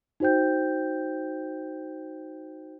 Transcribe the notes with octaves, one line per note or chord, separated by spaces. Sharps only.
D#4 F#4 C5 G5 G6